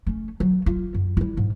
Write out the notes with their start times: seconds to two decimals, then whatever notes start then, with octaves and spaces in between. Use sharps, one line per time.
0.07 A3 C#4
0.40 F#3
0.66 F4
0.94 F#2
1.17 G3 E4
1.37 G#2